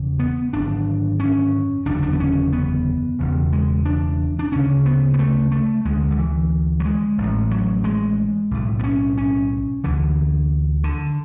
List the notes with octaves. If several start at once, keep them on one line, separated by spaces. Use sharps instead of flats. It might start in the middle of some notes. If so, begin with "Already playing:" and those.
Already playing: E1 E2 C#3
B3
G#1 F#2 D3 D4
C#4
F#1 E2 D3 D4
D4
B3
C#4
B3
E1 E2 C#3
G#3
D4
D4
D2 C#3 C#4
B3
B3
A3
A3
D2 D3 G#3
D3
E3
F#3
G#3
A1 A2
F#3
G#3
B1 A2
B3
C#4
C#4
D2 D3 E3
D3